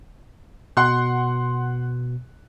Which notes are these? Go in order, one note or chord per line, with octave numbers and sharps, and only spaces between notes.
B2 F#5 C6 F#6